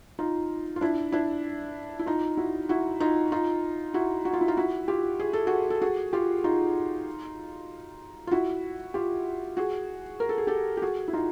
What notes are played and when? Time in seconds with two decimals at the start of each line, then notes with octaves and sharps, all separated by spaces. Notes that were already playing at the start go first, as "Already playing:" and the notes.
0.19 D#4 F4
0.76 F4
0.81 D4 E4
1.12 D4 E4
1.99 E4
2.06 D#4 F4
2.37 E4 F#4
2.69 E4 F#4
3.00 D#4 F4
3.32 D#4 F4
3.94 E4 F#4
4.25 F#4
4.33 F4
4.41 E4
4.48 D#4 F4
4.57 E4 F#4
4.88 F4 G4
5.20 G#4
5.33 A4
5.47 F#4 G#4
5.70 A4
5.82 F#4 G#4
6.13 F4 G4
6.44 D#4 F4
8.27 F4
8.31 E4 F#4
8.94 F4 G4
9.57 F#4 G#4
10.20 A#4
10.29 A4
10.38 G#4
10.47 G4 A4
10.77 G4
10.82 F#4 G#4
11.08 E4
11.13 D#4 F4